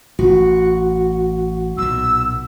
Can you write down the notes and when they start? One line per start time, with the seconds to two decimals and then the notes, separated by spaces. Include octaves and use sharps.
0.19 A1 F#4
1.78 B1 A#2 E6